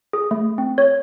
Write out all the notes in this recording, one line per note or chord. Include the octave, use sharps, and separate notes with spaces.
G#4
A3
C4
C#5